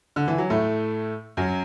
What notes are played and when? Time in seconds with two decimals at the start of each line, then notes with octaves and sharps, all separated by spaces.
0.16 D3
0.28 E3
0.38 F#3
0.50 A2 A3
1.37 F#2 F#3